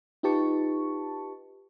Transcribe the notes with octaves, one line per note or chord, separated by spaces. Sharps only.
D#4 F4 G4 B4 A5 C#6